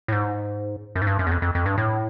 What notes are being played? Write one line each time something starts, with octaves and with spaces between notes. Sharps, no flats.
A2
G#2
F#2
G#2
G2
F#2
E2
F2
F2
F2
G2
A2